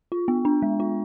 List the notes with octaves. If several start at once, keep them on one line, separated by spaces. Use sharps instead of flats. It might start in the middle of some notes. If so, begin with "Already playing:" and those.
F4
B3
D4
G#3
F4